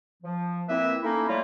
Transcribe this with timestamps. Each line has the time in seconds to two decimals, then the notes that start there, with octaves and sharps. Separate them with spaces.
0.23 F3
0.69 A#2 A#3 C4 E4 B4 E5
1.03 A3 A#3 C#4 D#4 E4
1.28 F#3 G3 A3 A#3 E4 F4